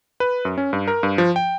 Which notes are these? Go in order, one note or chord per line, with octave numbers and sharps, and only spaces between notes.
B4
F#2
C#4
G2
A#4
G2
F3
G5